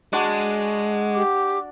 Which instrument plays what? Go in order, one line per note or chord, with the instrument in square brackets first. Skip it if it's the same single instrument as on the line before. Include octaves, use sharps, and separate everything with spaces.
[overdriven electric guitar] G#3 [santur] D4 F#4 D5
[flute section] G4 D6